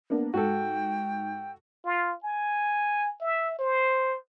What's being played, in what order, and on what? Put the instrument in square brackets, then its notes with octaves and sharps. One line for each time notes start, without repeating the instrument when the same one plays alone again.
[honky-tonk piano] A#3 B3 D4
[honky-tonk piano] G#2 [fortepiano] F#4 A4 [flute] G5
[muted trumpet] F4
G#5
E5
C5